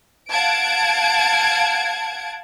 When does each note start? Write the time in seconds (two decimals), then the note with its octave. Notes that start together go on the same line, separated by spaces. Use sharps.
0.30 F5 F#5 A5 G#6 D7